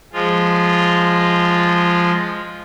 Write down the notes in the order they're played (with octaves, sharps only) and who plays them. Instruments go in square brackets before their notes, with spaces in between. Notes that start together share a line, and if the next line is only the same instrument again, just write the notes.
[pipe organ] F3 G#3 F4